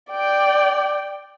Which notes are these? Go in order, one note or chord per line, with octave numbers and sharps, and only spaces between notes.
D5 G5